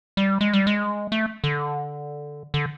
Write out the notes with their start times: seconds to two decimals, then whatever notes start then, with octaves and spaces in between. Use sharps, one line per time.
0.17 G3
0.41 G#3
0.53 G3
0.67 G#3
1.12 A3
1.44 D3
2.54 D3